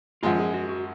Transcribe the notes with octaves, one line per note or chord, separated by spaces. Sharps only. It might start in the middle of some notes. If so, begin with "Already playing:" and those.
F#2 F3 G#3 F4
G#4
F#4
F#4